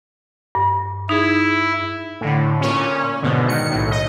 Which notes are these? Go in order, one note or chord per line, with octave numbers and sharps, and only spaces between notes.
G2
D#4 E4 G#4
A2 D3
A#2 C#4
G#2 B2 D3
D#3 C#7
B1 A2
D#5